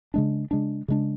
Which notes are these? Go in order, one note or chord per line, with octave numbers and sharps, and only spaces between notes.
C#3 G#3 D4
C#3 G#3 D4
C#3 G#3 D4